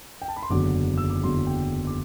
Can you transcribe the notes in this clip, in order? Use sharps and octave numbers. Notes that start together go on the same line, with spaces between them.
G5
A5
B5
C6
F#1 E2 D3 F#3 D6
E6
D6
F#1 E2 D3 F#3 C6
G5
D6